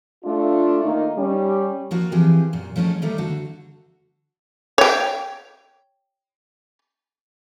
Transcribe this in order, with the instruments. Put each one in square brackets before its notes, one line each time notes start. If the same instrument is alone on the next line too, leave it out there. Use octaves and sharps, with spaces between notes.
[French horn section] A3 D4 F4
D#3 A#3 D#4
G3 C#4
[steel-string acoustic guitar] F3 A#3 F#4 A#4 B4
E3 F3 C4 G4 G#4
F#2 A#2
F3 A3 C#4 D#4 G#4
D#3 G3 A3 A#3 G4
D3 F#4
[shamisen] C#5 G5